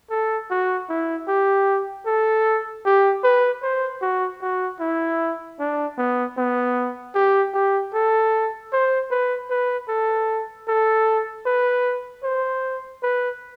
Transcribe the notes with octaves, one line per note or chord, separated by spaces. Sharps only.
A4
F#4
E4
G4
A4
G4
B4
C5
F#4
F#4
E4
D4
B3
B3
G4
G4
A4
C5
B4
B4
A4
A4
B4
C5
B4